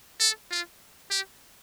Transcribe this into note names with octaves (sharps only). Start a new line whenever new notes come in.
A4
F4
G4